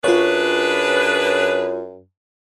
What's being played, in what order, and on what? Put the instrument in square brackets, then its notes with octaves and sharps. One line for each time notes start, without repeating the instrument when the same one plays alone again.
[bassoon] F#2 [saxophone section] D4 G#4 B4 [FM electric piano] F4 C#5